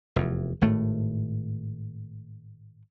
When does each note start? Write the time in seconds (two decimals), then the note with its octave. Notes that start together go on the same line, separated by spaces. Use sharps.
0.16 F1 E2
0.61 G#1 A2 A3